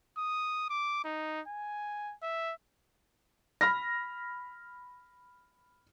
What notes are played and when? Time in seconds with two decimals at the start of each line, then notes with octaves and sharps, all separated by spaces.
0.18 D#6
0.70 D6
1.04 D#4
1.48 G#5
2.23 E5
3.61 B5 F6 A#6